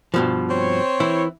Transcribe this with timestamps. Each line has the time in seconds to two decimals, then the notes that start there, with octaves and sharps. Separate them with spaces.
0.14 G2 B2 F3
0.50 C4 C5 C#5
1.00 E3 E4